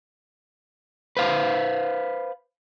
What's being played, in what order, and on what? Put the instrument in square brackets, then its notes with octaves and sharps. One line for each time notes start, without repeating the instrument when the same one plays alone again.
[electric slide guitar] B4 C5 F5